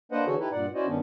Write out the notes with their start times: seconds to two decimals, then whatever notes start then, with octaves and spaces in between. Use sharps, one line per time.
0.12 A#3 D4 B4 C5 D#5 F#5
0.26 D3 E3 F#4 G#4 A4 C#5
0.39 D#4 E4 G4 A4 B4
0.52 G2 A#2 D5 F#5
0.74 C#4 E4 F#4 C5 D5 D#5
0.86 G2 D#3 B3 C#4 D4